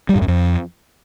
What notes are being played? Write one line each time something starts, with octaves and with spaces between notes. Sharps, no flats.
G3
G#2
F#2
F2